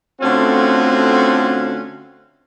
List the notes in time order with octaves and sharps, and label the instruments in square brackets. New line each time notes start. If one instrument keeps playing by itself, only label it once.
[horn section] D3 A3 C4 C#4 F4 F#4